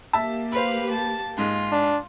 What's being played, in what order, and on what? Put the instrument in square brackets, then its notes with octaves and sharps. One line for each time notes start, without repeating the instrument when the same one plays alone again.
[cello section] A#3 G4 [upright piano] E5 A5
[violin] B4 F5 [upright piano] C5 B5
[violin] A5
[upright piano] G#2 G#3 [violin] F4
[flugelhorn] D4